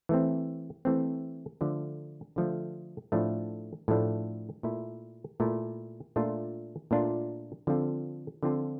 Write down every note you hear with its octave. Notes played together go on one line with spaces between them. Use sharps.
E3 A3 C4
E3 A3 C4
D3 F3 A3
D3 F3 A3
A2 F3 A3 D4
A2 F3 A3 D4
A#2 A3 E4
A#2 A3 E4
A#2 A3 D4 F4
A#2 A3 D4 F4
D3 F3 C4 F4 A4
D3 F3 C4 F4 A4